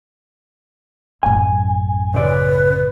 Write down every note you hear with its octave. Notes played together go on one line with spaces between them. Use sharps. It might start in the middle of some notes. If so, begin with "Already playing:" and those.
A1 F#2 G#5
C#3 B4 D5